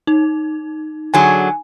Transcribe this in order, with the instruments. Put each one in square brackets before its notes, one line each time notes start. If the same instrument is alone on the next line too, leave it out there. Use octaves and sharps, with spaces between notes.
[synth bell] D#4
[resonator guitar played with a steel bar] D3 F#3 G#4 [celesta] G#5